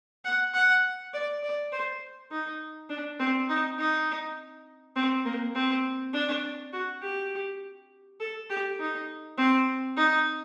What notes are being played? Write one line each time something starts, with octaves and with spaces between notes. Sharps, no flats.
F#5
F#5
D5
D5
C5
D#4
D4
C4
D#4
D#4
C4
A#3
C4
D4
F#4
G4
A4
G4
D#4
C4
D#4